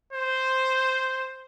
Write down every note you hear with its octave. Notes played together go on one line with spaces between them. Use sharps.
C5